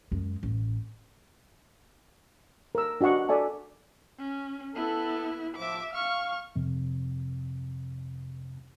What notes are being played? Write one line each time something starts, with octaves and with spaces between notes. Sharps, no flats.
F#2 G#3
A1
A#4 E6
D4 F#4 D#5 F#5 C#6
A4 D5 E5 G#5 A5
C#4
B3 E4 A4
A2 F3 E5 D6
F5 C#6 F6
F2 C3